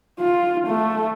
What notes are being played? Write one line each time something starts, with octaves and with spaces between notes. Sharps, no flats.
F4
A3